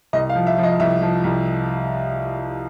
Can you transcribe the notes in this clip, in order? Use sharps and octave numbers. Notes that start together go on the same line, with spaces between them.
C2 D#5
F5
F3
E5
F3
D#5
C2 E5
F3
C2